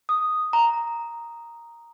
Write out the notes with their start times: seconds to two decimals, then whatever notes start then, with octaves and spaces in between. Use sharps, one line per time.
0.09 D#6
0.53 A#5